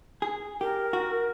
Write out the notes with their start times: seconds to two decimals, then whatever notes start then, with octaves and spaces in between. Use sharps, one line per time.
0.22 G#4
0.61 G4 A#4
0.93 F#4